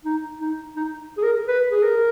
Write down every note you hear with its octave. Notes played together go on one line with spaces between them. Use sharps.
D#4
D#4
D#4
G#4
A#4
B4
G#4
A#4